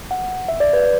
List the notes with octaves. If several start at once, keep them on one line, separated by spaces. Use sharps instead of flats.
F#5
E5
D5
B4